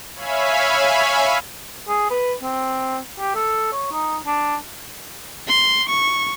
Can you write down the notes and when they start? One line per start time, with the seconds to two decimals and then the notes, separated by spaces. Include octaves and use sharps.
0.15 C#5 E5 F5 G#5 B5
1.88 G#4
2.11 B4
2.43 C4
3.19 G4
3.35 A4
3.72 C#5
3.92 D#4
4.27 D4
5.47 C6
5.89 C#6